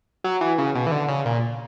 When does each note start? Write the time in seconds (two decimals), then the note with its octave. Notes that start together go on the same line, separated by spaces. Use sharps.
0.24 F#3
0.41 E3
0.58 C#3
0.75 B2
0.86 E3
0.92 D3
1.08 C#3
1.25 A#2